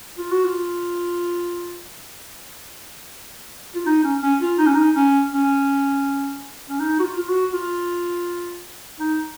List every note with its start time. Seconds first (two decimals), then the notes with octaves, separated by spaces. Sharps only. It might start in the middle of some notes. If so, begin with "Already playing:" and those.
0.18 F4
0.31 F#4
0.44 F4
3.75 F4
3.86 D#4
4.04 C#4
4.23 C#4
4.41 F4
4.58 D#4
4.66 C#4
4.74 D#4
4.96 C#4
5.33 C#4
6.70 C#4
6.79 D#4
7.00 F#4
7.04 F4
7.18 F4
7.28 F#4
7.54 F4
9.00 D#4